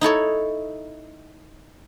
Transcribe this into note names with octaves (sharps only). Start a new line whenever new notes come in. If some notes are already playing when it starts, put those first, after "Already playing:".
D#4 E4 A4 C#5